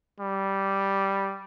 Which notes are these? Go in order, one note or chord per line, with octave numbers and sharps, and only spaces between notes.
G3